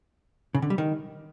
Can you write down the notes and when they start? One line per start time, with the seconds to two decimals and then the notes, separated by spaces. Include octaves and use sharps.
0.55 C#3
0.62 D3
0.70 G3
0.78 D#3